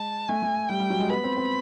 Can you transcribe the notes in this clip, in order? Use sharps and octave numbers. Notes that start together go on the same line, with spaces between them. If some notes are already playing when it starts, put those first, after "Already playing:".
Already playing: G#3 A5
A3 G#5
A3
G3 G5
G3
F#3
G#3
B3 B5
C4
C4